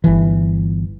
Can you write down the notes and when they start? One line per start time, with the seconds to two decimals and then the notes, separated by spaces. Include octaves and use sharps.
0.04 G1 E3